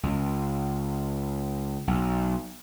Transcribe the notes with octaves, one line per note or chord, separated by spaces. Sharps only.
C#2
B1